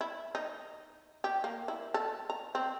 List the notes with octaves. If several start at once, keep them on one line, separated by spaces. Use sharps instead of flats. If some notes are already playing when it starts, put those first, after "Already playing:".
E4
D#4
G4
A#3
E4
A4
A#5
C4